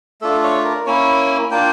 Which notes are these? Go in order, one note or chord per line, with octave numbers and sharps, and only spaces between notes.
A3 D4 F4 A4
C#5
A#4
A#3 C#4 E4 C#5
A#3 D4 F4 G5